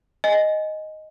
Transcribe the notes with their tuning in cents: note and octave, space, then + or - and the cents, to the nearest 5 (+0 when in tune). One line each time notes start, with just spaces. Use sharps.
D#5 +0 G#5 +0